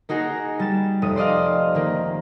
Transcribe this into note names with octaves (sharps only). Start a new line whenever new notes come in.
A#3 D#4 F#4 G#4 A#4
G3 A6 E7
F1 D#6
C5 D5 D#5 F5
D#3 A#3